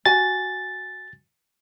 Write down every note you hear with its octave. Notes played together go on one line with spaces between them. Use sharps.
F#4 G#5 A6